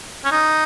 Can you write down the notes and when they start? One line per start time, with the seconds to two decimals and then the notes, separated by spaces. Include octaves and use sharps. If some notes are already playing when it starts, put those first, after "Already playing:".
0.25 C#4
0.32 D#4